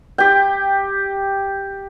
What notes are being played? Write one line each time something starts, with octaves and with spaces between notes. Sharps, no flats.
G4 G5